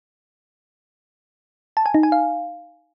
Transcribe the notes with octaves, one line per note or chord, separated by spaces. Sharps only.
A5
G#5
D#4
G#5
F5